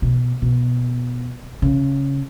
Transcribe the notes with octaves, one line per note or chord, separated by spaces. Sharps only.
B2
B2
C#3